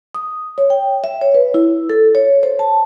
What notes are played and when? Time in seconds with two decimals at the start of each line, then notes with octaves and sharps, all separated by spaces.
0.15 D#6
0.58 C#5
0.70 G5
1.04 E5
1.21 C#5
1.34 B4
1.54 E4
1.90 A4
2.15 C#5
2.43 C5
2.59 A5